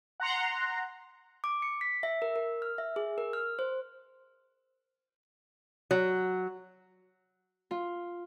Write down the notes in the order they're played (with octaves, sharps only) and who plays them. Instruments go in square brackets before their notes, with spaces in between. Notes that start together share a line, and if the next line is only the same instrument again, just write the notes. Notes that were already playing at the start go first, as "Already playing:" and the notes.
[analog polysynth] F#5 A#5 C6
[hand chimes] D6
C#7
B6
E5
A#4
A#4
F6
E5
G#4
A#4
F6
C5
[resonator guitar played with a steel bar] F#3
[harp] F4